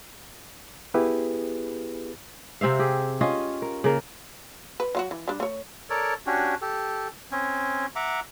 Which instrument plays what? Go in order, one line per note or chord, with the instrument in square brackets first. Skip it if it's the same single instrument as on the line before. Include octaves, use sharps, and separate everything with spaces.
[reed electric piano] B3 E4 G4 G#4 B4
[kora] C3 C4 E5 F5
G4 G#4
C#4 F4 D#5
A#4
C#3 A#3 A#4
[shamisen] B4
F#3 F4 F#4
E3
G3 D4
A3 C#5
[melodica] A4 A#4 C#5 D5
C#4 D4 F#4 G4
G4 A4
C4 C#4
E5 F#5 A#5 D6